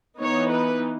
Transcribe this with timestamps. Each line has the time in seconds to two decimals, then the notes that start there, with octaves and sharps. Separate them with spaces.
0.20 E3 B3 D#4 C#5
0.51 B4